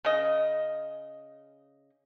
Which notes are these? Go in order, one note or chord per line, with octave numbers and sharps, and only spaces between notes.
C#3 D#5